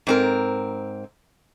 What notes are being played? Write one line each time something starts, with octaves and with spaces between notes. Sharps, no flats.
G#2 C4 A#4